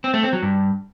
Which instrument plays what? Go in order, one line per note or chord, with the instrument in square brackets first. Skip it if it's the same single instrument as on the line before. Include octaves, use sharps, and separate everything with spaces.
[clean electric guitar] C4
A3
C4
F#3
G2